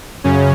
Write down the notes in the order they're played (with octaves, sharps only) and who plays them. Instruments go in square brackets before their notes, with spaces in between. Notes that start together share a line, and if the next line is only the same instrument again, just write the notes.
[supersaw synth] F#2 C#3 C#4